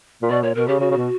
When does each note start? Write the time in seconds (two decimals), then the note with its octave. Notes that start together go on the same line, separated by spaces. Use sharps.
0.22 A#2
0.30 B2 D5
0.43 A#2 C#5
0.55 B2 A#4
0.68 C#3 G4
0.80 C#3 F#4
0.91 C#3
0.96 B2